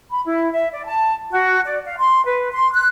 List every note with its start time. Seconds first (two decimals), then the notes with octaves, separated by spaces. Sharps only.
0.10 B5
0.25 E4
0.52 E5
0.73 D5
0.86 A5
1.31 F#4
1.65 D5
1.86 F5
1.97 C6
2.26 B4
2.52 C6
2.73 F#6